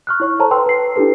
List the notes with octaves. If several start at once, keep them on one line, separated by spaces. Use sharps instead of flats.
C#6 F6 F#6
E4 C#5 C#6
A4 C5 C#5 A5 A#5
B4 G5 C6 E6
B4 C7
D4 E4 G4 A4 B4